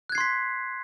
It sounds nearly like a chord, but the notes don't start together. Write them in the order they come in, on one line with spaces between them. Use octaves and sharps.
F#6 G#6 C7 C6 B6